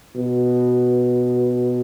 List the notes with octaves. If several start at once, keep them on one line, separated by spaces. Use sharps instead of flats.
B2